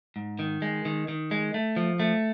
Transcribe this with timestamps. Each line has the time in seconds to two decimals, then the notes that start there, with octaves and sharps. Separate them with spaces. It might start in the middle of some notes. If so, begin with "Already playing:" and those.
0.16 G#2
0.39 D#3
0.62 G#3
0.85 D#3
1.08 D#3
1.31 G#3
1.54 A3
1.77 F3
2.00 A3